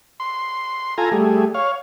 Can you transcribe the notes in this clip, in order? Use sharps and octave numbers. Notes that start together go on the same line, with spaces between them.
C6
F4 A4 G#5 A#5
G3 A3 G#4
C#5 F5